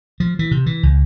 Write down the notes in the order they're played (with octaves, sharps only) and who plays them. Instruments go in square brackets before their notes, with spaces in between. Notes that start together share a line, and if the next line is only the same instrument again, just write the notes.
[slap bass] F3
E3
C3
E3
C#2